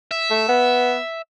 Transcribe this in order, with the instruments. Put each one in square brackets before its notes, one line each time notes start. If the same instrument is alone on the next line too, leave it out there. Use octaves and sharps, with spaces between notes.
[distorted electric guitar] E5
[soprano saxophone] A3
B3